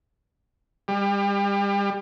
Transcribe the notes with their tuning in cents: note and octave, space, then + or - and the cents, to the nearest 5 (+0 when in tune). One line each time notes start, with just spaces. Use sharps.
G3 +35